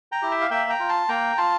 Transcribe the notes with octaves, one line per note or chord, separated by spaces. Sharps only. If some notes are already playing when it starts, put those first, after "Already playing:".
G5 A#5
E4 G4
E5 G5
F5
A#3 E5 G5
G5 A#5
F4
A5 C6
A#3 G5 A#5
F4 A5 C6